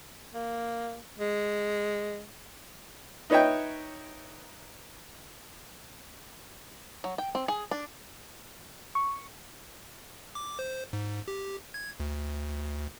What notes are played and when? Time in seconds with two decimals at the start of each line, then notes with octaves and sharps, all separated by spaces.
0.34 A#3
1.19 G#3
3.30 D#4 B4 C#5 D#5 E5 G5
7.04 F#3
7.18 G5
7.35 C4
7.48 G#4
7.71 D4
8.95 C#6
10.35 D6
10.59 C5
10.93 G#2
11.28 G4
11.74 G#6
12.00 D2